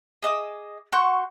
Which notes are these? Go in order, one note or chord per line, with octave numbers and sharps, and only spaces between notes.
G#4 D#5 D6 E6
F#4 C6 C#6 G6